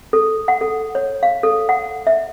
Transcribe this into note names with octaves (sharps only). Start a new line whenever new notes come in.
A4
F#5
A4
C#5
F5
A4
F#5
E5